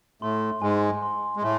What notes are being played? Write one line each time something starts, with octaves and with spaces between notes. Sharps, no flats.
A2 A3 C6
G#2 G#3 G#5
C6
G#3
A2 A3 C6